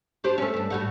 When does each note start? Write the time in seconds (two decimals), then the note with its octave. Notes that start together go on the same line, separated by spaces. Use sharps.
0.24 D4 G4 C5
0.38 A3 C#4
0.54 G2 D4
0.70 A2 G3 F#4